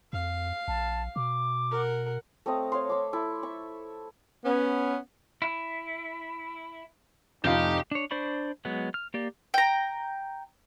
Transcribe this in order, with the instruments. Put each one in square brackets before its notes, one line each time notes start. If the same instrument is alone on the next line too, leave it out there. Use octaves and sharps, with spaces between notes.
[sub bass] F2 [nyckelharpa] F5
[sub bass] A#1 [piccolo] A5
[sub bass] B2 [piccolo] D6
[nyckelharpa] A#4 F#5
[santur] A3 C4 D#5 F5
C#5 F5 C6
E5 C6 D6
E4 A4
E5 C#6
[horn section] B3 C#4
[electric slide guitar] E4
[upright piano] F1 F4 F5 [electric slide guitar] F2 A2 F3 [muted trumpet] D#4 [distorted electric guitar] G4
[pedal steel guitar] D4 C#5
D4 C5 D5 B5 C#6
F#3 G#3 B3
F6
A#3 G4 D5
[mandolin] G5 A#5